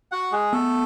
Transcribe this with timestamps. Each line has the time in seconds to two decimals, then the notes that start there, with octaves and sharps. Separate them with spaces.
0.12 F#4 F#5
0.32 G#3 G#4
0.52 A3 B3 A4